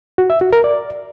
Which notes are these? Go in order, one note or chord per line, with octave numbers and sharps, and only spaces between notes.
F#4
E5
F#4
A#4
D5